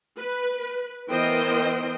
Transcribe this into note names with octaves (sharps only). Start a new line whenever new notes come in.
B4
E3 B3 A#4 C5 D#5 G5